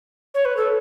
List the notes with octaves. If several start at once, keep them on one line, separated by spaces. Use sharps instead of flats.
C#5
B4
A4